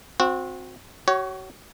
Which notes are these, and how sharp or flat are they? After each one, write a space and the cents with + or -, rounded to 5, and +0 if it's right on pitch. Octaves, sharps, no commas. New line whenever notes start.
C4 +0 F#4 -30
F#4 +35 C#5 +0